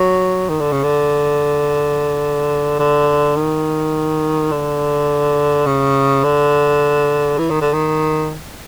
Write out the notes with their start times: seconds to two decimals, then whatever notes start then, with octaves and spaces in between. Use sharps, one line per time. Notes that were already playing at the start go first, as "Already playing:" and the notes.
Already playing: F#3
0.49 D#3
0.60 D3
0.72 C#3
0.84 D3
2.79 D3
3.36 D#3
4.51 D3
5.66 C#3
6.24 D3
7.39 E3
7.50 D#3
7.61 D3
7.73 D#3